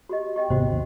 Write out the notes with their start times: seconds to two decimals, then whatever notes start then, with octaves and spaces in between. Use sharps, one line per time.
0.09 F#4 G4 D#5
0.36 G4 D#5 G5
0.50 G#1 C3 B3 F#4 C5
0.71 D#2 C#3